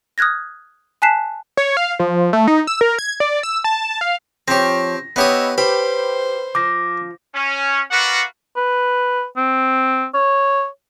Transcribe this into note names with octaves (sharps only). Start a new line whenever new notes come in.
D#6 F6 F#6 G#6 A#6
G#5 A5 F#6 B6 C7 E7
C#5
F5
F3
A3
D#4
E6
A#4
G#6
D5
E6
A5
F5
F3 C4 G4 C#5 A#6
B3 D#4 E4 G4 C#5 D#6
G4 B4 C5 B5
F3 D6 A#6
C#4
F#4 A#4 B4 D5 F5 F#5
B4
C4
C#5